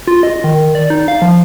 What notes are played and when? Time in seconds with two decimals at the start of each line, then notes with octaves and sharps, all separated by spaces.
0.07 F4
0.23 D#5
0.44 D#3
0.75 D5
0.90 D#4
1.08 F5
1.22 F3